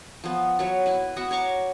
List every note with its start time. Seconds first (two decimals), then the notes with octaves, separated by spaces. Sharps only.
0.24 F3 B3
0.59 F#3 B4 C#5
0.86 E4 B4
1.16 B3 F#4 E5 F#5
1.31 C#5 A#5 C#6 D6